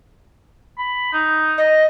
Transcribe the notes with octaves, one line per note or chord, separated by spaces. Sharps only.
B5
D#4
D#5